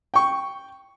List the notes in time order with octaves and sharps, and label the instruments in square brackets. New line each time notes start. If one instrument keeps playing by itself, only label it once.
[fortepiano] G5 C#6